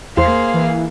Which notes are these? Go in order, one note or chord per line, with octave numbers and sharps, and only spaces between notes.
E2 A#3 G#4 C5 F5
E3